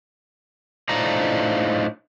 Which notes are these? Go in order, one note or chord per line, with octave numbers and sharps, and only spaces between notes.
A2 D4 D#4 F4 C5 A#5